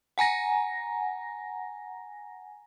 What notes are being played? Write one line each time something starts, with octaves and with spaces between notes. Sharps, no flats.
F#5 G#5 A#5 A#6